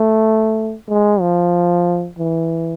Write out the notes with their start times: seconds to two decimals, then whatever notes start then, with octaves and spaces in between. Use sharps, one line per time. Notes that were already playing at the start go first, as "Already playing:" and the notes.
Already playing: A3
0.89 G#3
1.21 F3
2.19 E3